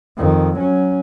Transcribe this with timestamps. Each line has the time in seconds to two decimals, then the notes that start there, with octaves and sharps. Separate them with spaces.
0.18 F2 D#3
0.57 F#3 C#4